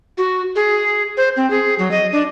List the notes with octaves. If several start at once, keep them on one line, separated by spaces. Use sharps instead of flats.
F#4
G#4
C5
C4
G#4
F#3
D#5
D4